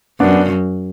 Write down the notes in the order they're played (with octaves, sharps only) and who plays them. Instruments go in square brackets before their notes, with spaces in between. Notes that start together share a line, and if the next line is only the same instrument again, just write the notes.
[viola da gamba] F#2 [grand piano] B3 D4